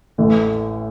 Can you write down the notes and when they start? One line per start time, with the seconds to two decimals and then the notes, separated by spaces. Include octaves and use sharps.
0.18 A1 A2 E3 A3